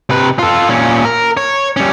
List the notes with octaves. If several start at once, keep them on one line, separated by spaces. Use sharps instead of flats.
C3 B4
F4 A4
A#2 C#4
A#4
C#5
G3 C#4